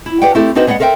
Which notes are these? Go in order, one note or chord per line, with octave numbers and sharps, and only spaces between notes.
E4
G4 B4 D5 F#5 G5
A3 C4 E4 G4 A4
C4 D4 D#4 F#4 B4 C5
G#3 B3 D5 D#5 F#5
A4 A#4 C5 E5 G5